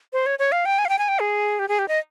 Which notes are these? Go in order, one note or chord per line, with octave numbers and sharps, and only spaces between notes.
C5
C#5
C#5
F5
G5
G#5
F5
G5
G#5
G5
G#4
G4
G#4
G4
D#5